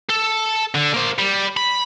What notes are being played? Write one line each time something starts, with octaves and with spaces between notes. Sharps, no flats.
A4
D3
A#3 C5
G3
B5